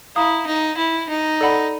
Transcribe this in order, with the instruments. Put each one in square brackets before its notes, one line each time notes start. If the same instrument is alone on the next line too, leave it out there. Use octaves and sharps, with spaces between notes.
[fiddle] E4 [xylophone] F5 A#5 D#6
[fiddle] D#4
E4
D#4
[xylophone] A4 D5 F#5 B5